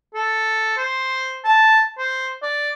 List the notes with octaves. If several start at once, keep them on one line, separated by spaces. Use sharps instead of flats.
A4
C5
A5
C5
D5